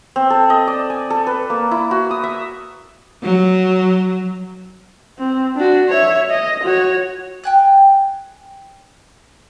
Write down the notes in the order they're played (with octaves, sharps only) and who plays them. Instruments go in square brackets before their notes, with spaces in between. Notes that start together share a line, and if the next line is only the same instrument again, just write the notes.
[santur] C4
A4
D#5
D5
G#5
A4
B4
A#3
E4
F#4
D#6
E5
[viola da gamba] F#3
[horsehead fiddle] C4
D4 F#4
C#5 E5
D#5
F#4 C#5
[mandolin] G5 G#5 F#6